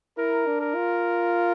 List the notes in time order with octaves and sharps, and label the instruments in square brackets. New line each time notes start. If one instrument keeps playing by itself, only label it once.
[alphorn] E4 [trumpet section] A#4
[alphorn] D4
[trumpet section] A#4
[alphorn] F4